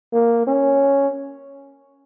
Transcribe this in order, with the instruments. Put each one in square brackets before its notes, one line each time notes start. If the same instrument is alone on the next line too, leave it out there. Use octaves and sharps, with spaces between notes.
[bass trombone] A#3
C#4